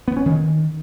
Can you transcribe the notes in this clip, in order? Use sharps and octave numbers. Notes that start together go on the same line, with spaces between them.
B3
C#4
D#3